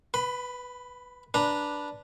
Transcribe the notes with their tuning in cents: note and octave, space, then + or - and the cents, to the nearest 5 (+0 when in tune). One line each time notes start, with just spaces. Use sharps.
B4 +0 B5 +35
D4 +0 B4 -10 A#5 -10